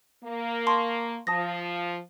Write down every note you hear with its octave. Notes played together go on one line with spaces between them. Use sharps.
A#3
A5 C6 C#6
F3 A5 D#6 A#6